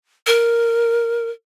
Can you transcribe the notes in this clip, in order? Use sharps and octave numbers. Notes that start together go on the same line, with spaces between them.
A#4